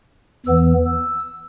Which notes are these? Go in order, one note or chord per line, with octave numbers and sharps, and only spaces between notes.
E2 E3 B3 E6
E6